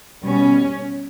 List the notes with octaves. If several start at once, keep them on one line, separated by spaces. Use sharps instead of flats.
B2 G3 B3 C#4